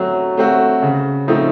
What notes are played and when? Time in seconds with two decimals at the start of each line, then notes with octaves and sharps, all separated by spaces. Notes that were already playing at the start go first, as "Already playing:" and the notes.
Already playing: F#3 A3 C4 F#4
0.37 A3 C4 F#4
0.82 C#3
1.28 F3 A3 C4 D#4